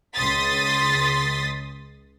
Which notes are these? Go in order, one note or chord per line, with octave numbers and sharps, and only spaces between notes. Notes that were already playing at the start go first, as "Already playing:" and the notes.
C#2 C6 D#6 A6 B6